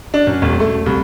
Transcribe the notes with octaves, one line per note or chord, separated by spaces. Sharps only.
D4
F#2
E1
A3
C2